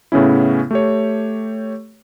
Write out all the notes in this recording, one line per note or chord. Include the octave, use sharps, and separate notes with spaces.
A2 C#3 B3 C#4 E4
A3 G4 C#5